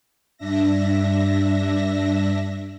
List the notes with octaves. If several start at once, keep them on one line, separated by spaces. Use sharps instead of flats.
G2 D4 E5 A#6